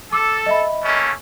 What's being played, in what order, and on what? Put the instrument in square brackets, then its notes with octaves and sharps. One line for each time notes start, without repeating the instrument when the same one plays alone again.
[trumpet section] A4 [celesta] D6 E6
[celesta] D#5 E5 B5
[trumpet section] A3 A#3 C#4